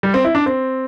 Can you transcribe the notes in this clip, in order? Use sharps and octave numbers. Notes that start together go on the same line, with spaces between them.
G3
C4
E4
D4
C4